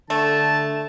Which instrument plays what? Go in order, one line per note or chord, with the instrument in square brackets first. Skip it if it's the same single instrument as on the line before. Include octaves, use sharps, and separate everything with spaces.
[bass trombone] D3 [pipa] A3 [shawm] A5